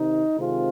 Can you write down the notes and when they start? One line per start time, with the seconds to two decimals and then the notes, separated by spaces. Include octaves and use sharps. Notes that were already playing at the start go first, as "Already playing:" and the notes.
Already playing: C3 D#3 D#4
0.37 C3 D#3 G#3 C4 F4